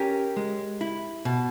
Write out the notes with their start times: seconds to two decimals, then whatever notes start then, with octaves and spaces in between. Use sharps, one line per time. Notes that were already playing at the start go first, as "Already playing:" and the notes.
Already playing: C#4 G4 A#4
0.37 G#3
0.81 E4
1.25 B2